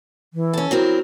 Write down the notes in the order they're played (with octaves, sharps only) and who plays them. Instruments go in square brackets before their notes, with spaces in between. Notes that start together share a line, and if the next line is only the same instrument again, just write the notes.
[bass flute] E3
[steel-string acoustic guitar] C#4 A4
[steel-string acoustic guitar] F#3 C4 A#4 [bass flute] E4